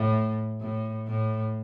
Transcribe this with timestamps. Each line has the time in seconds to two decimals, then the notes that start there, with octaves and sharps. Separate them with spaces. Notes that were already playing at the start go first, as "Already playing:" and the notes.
Already playing: A2
0.61 A2
1.07 A2